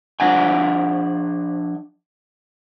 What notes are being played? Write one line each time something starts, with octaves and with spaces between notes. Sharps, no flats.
F3 D4 F#5 G#5